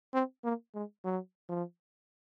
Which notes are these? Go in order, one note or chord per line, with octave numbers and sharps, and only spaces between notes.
C4
A#3
G#3
F#3
F3